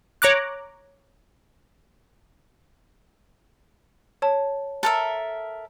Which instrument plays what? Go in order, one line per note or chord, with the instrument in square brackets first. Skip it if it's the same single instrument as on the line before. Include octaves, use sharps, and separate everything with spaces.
[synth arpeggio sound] C#5 A#5 D6 F#6
[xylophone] C#5 A5
[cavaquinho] A4 A#4 E5